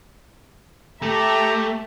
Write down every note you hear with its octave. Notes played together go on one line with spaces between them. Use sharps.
A3 G4 E5 A5 A#5